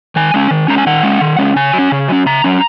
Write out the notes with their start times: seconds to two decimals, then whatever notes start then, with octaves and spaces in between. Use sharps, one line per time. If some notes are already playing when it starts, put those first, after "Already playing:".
0.16 D#3 G#5
0.34 G#3 C#4
0.51 D#3
0.68 G#3 C#4 A#5
0.78 G#5
0.86 D#3 F#5
1.03 G#3 C#4
1.21 D#3
1.39 G#3 C#4
1.56 C#3 G#5
1.73 F#3
1.78 C#4
1.92 C#3
2.09 F#3 C#4
2.26 C#3 A#5
2.44 F#3 C#4